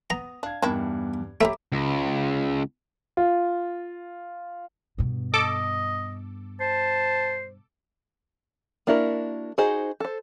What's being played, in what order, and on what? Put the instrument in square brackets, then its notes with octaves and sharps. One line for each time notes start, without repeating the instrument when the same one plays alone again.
[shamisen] B3 [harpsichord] A#5 [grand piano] D#6
[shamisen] D4 [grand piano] F5 G#6
[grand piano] E2 G2 [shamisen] D#3 D4 E4
[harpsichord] A3 [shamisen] G4 C#5 E5 [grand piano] A#5 B5 D6
[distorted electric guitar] C#2
[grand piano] F4
[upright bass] G2 B2
[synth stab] A4 D6 [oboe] D#5
[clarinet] C5 [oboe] A5
[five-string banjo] A#3 D4 E4 F#4 A#4
D#4 F#4 G#4 C5 D#5
A4 C5